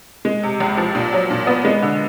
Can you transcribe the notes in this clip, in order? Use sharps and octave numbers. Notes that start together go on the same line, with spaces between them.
G#3
C3
C#2
F3
A#2
F#3
A#2
B3
G#3
D3